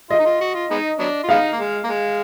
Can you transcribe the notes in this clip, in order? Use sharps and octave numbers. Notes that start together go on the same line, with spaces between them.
F4 D#5
D#4
F4
F#4
F4
G#3 B3 D#4
F#3 B3 D4
F4
G#3 B3 D#4 F5
A#3
G#3
A#3
G#3